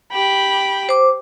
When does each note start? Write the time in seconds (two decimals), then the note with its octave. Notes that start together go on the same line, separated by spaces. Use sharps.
0.12 G4 G5 B5
0.89 C5 D6